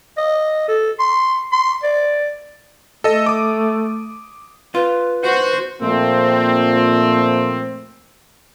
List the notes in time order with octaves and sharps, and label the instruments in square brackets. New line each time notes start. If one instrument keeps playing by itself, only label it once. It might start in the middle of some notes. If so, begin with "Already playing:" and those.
[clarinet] D#5
A4
C6
C6
D5
[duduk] A3 [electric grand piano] A4 D#5
[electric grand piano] D6 D#6
[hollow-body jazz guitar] F4 [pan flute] B4
[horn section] F#4 [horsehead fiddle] C5
[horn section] A#2 F3 A3 A#3 C4